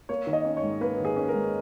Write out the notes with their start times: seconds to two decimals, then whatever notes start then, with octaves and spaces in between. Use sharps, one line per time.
0.09 A#3 C#5
0.27 D#3
0.33 D#5
0.45 C#4
0.57 C#5
0.62 G#2
0.81 A#3 B4
0.98 D#3
1.05 G#4
1.16 C#4
1.28 A#4
1.34 G#2